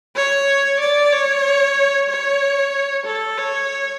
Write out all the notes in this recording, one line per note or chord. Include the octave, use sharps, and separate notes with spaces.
C#5
D5
C#5
C#5
A4
C#5